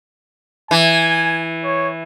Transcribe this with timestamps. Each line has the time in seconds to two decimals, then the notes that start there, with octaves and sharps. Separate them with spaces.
0.71 E3 G#5
1.64 C#5